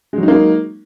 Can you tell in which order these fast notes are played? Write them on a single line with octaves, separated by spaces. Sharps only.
G#3 F#3 D#4 A#3